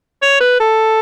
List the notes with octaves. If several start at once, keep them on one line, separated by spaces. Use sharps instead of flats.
C#5
B4
A4